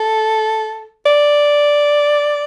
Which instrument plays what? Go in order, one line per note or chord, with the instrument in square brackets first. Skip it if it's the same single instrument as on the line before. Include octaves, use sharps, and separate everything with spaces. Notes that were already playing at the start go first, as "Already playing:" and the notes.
Already playing: [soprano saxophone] A4
D5